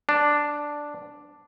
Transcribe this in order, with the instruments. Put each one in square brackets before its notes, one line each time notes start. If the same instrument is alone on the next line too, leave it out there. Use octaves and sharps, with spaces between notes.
[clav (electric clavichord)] D4